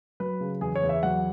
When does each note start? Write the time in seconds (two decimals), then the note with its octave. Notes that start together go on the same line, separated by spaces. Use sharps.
0.20 F#3 B4
0.40 C#3
0.61 E2 G#4
0.76 C#5
0.83 E2
0.89 E5
1.03 F#3 F#5